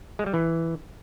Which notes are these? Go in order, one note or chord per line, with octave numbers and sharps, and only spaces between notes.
G#3
G3
E3